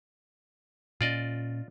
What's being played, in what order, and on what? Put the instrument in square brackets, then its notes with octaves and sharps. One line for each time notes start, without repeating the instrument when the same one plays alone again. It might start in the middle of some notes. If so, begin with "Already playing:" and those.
[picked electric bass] A#2 C#4 [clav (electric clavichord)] F4 D5 D#5